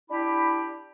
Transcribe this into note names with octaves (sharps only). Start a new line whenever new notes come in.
D4 E4 G4 B5